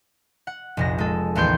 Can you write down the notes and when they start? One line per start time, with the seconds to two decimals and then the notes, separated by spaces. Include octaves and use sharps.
0.47 F#5
0.77 F1 A#1 A#6
0.98 G#3 A4
1.35 A1 D#2 B3 G5 C6 G6